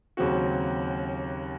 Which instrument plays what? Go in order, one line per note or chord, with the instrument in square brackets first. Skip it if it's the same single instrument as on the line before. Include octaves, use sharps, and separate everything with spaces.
[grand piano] D#2 C#3 F#3 C4 F#4